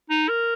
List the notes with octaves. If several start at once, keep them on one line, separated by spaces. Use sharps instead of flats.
D#4
A#4